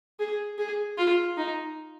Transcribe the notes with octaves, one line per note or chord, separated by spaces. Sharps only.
G#4
G#4
F4
D#4